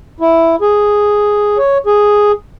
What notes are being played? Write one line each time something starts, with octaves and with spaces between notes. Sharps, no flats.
E4
G#4
C#5
G#4